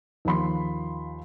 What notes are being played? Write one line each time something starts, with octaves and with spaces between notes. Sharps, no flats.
D#2 F3 B5 C6